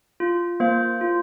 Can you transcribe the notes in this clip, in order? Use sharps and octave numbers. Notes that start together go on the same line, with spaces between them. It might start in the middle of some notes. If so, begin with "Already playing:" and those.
F4
A#3 C5
F4